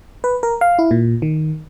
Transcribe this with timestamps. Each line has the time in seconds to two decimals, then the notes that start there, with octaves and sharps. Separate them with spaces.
0.24 B4
0.43 A#4
0.61 F5
0.79 E4
0.91 A#2
1.22 D#3